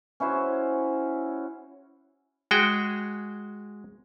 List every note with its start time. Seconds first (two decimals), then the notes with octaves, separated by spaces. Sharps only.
0.20 C#4 E4 F#4 C5
2.51 G#3 F#4 G#4 G5